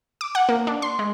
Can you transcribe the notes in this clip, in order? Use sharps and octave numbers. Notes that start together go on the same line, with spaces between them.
D6
F#5
A#3
D4
C6
G#3